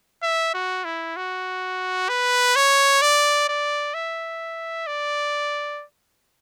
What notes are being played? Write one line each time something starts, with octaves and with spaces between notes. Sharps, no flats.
E5
F#4
E4
F#4
B4
C#5
D5
D5
E5
D5